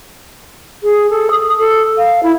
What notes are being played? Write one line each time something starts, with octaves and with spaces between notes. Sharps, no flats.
G#4
A4
D#6
A4
F5
E4